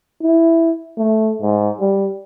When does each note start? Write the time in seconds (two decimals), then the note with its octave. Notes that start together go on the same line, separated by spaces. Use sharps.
0.22 E4
0.98 A3
1.42 G#2
1.80 G3